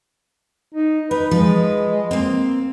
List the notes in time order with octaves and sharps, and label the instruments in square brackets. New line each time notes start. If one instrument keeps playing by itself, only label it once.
[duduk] D#4
[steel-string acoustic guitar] D#4 [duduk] B4
[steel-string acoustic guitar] F3 B4 [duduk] G#3
[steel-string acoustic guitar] A#3 C4